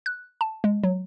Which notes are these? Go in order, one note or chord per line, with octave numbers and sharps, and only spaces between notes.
F#6
A5
G#3
F#3